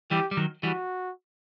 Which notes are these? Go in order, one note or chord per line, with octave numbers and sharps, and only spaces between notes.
E3 G3 G4
G3
D#3 F#3
E3 G3 F#4